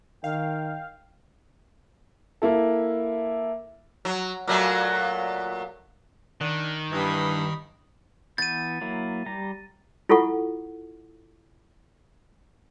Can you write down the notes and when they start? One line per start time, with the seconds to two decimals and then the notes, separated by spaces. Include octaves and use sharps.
0.24 D#3 F5 G5
2.42 A#3 E4 A4
4.05 F#3
4.47 A#2 F#3 A3
6.41 D#3 D4
6.92 G2 E3 B5 D#6
8.38 E3 B3 G6 A6 D#7
8.81 F#3 A#3 E4
9.26 G3 G4 A#5
10.09 E4 F4 A4 F#5 C#6